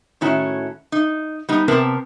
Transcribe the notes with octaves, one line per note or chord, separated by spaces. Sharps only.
A2 D#3 C#4 E4 F#4
D#4
G3 B3 D#4
C3 B3 C4 A#4 B4 A5